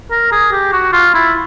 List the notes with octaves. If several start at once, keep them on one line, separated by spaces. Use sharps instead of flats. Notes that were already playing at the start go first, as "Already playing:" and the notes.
A#4
G#4
G4
F#4
F4
E4